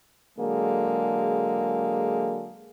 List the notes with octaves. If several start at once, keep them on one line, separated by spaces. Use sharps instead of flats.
D3 F#3 G#3 A#3 G#4